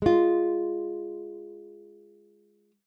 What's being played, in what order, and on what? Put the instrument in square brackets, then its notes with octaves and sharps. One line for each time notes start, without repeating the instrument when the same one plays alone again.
[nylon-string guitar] G#3 F4